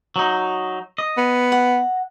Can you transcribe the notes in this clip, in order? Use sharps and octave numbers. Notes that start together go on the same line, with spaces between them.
F#3 D#4
D#5
B3
F#5